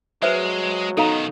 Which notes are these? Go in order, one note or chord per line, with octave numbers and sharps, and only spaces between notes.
F#3 G#3 B4 C5 E5
B2 D#3 D#4 A4 F5 A#5